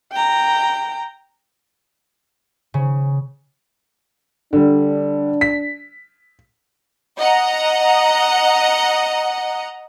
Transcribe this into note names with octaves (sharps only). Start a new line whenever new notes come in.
G5 A#5
C#3
D3 G3 D4
B6
D#5 F#5 A#5